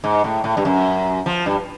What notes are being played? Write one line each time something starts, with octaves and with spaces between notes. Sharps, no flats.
G#2
A2
A2
G2
F#2
F3
G2